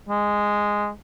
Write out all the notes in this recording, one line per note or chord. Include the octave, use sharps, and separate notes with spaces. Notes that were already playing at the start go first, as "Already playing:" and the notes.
G#3